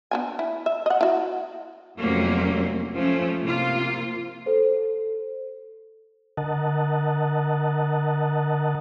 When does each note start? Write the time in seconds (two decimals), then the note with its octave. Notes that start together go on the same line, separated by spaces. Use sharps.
0.11 B3 D4 G#5
0.39 E4
0.66 E5
0.86 D#5 F#5
1.01 E4 F#4
1.99 F2 C3 F#3 A3 A#3 C#4
2.94 F3 A3 C#4
3.40 C3 A#3 F4
4.46 A4 C5
6.37 D3 A#4 D#5 F#5 A5